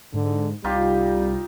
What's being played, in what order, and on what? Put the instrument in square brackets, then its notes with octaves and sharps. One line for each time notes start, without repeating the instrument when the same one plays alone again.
[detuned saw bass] G#2 [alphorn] D3
[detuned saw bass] C2 [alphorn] G3 [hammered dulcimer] D#4 F4 G4